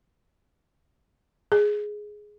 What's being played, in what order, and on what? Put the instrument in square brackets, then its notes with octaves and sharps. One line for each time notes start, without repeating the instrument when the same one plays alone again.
[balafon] G#4